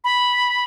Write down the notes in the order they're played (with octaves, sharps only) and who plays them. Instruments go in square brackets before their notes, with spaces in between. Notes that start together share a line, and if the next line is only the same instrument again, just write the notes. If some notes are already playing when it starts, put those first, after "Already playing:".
[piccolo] B5